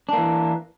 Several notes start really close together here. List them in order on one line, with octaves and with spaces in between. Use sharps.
D4 A#3 E3